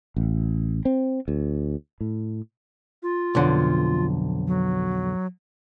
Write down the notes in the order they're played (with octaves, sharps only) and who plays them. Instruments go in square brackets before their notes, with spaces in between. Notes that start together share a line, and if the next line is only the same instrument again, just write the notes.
[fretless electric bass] A1
C4
D2
A2
[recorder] F4
[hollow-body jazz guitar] B1 F2 D3
[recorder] F#3